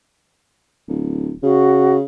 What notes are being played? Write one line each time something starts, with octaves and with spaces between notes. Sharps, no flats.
D1
C#3 F#4